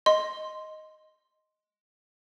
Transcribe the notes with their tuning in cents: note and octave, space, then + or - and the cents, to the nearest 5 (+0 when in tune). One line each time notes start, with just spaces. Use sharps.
D#5 +0 C6 +0